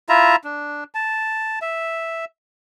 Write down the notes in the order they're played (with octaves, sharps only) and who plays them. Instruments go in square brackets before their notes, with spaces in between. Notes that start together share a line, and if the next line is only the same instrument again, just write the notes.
[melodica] E4 F4 E5 A#5
D4
A5
E5